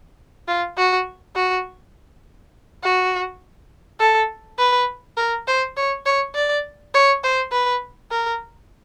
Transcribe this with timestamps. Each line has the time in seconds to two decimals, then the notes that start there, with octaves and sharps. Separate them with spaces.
0.48 F4
0.77 F#4
1.36 F#4
2.83 F#4
4.00 A4
4.58 B4
5.17 A#4
5.48 C5
5.77 C#5
6.06 C#5
6.34 D5
6.94 C#5
7.24 C5
7.52 B4
8.11 A#4